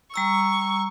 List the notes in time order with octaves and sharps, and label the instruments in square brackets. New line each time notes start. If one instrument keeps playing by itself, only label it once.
[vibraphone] G3 A#5 E6 [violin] C#6